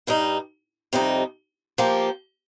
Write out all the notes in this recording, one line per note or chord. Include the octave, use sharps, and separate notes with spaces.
G2 G3 D#4
F2 C3 G3 D#4
F3 A#3 G4